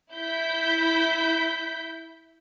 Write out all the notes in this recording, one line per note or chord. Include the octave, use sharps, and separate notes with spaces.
E4 G6 B6